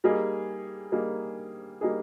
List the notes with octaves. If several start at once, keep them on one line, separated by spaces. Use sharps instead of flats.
G3 A#3 D#4 G#4
G3 A#3 D#4 G#4
G3 A#3 D#4 G#4